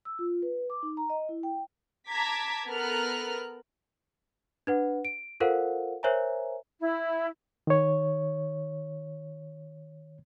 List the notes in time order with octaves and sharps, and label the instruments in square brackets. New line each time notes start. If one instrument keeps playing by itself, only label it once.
[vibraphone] E6
F4
B4
D6
D#4
A#5
D#5
E4
G5
[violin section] A5 A#5 D6 G#6 B6
B3 A4 A#4 F6 F#6
[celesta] D4 B4 F#5
D7
F4 A4 A#4 C5 F5 F#5
A#4 C5 C#5 E5 G#5 A#5
[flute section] E4
[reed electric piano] D#3 C#5